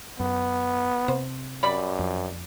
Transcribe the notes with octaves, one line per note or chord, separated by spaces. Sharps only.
F#2 B3
C3 C5
F#2 G3 D5 B5
F2